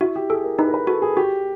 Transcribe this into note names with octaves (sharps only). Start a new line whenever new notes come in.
E4 F#4
G4
G#4 A4
A#4
D#4 B4
A#4
B4
F#4 A4
G#4
F#4 G4